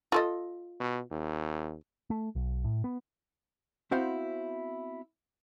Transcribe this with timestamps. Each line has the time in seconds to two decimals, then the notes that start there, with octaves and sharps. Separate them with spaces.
0.12 F4 A4 D#5
0.80 B2
1.10 D#2
2.10 A3
2.35 B1
2.64 A2
2.84 B3
3.91 B3 C4 E4 F#4 C5 F5